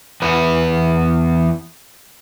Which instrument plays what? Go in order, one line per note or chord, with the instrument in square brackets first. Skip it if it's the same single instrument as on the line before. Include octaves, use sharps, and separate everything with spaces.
[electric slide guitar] E2 B3 B4